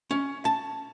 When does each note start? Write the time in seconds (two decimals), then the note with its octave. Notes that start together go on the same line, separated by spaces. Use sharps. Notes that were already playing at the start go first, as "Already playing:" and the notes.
0.11 C#4
0.45 A5